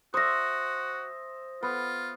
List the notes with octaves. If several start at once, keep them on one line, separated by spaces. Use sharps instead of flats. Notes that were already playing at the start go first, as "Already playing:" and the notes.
F#4 C5 E5 D#6 A#6
B3 F4